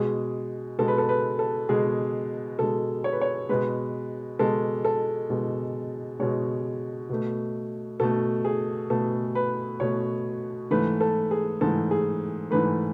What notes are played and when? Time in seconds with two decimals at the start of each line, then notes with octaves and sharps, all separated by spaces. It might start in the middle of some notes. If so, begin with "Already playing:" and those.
Already playing: B2 G#3 G#4
0.78 B2 G#3 A4
0.88 B4
0.98 A4
1.09 B4
1.39 A4
1.69 B2 G#3 G#4
2.59 B2 G#3 A4
3.04 C#5
3.12 B4
3.21 C#5
3.49 B2 G#3 B4
4.39 B2 G#3 A4
4.85 A4
5.30 B2 G#3
6.19 B2 G#3 C#5
7.09 B2 A3
8.00 B2 A3 A4
8.45 G#4
8.90 B2 A3 A4
9.35 B4
9.80 B2 A3 C#5
10.71 G#2 E3 A3 B4
11.01 A4
11.31 G#4
11.61 G#2 E3 A3 A4
11.91 G#4
12.51 G#2 E3 A3 B4